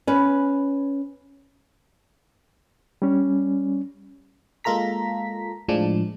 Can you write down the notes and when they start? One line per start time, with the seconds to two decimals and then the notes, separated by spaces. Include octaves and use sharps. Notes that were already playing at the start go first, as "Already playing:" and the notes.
0.07 C#4 B4
3.02 G3 C#4
4.64 G#3 A#3 F4 A4 A#5 B6
5.68 A2 F3 G#3 D4